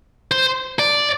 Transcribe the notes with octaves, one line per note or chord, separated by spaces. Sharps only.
C5
D5